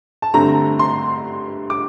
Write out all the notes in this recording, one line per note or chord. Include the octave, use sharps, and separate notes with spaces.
A5
G2 D3 A3 C4 A#5
C6
D6